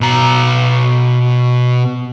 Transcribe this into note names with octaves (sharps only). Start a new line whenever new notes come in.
B2 A#5